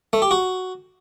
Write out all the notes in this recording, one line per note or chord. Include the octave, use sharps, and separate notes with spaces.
A3
G4
F#4